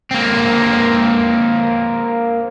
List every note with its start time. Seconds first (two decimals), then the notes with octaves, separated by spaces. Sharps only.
0.11 A#3 C4